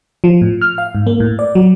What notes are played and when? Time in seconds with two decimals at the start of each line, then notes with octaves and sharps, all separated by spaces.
0.24 F3
0.41 A2
0.61 F6
0.78 F5
0.95 G#2
1.07 A#3
1.20 A2
1.39 D5
1.55 F#3